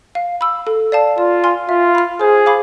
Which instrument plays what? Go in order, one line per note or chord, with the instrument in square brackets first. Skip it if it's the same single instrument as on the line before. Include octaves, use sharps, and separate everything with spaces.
[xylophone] F5
B5 E6
A4
D5 F5 A5
[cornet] F4 [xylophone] D5
[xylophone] G#5 C6 F6
[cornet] F4 [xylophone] E5
[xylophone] B5 F6
[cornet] G#4 [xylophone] C5
[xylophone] F5 B5 D6